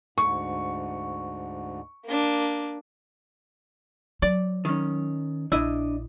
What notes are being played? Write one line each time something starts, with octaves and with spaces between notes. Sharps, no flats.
D2 G#2 C#6
A#3 D4
F#3 D5
D#3 C#4
A#1 D4 E4 D#5